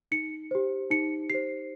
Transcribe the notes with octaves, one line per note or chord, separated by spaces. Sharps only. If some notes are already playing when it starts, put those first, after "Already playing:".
D#4 C#7
G4 C5
D#4 C#7
G4 C5 C7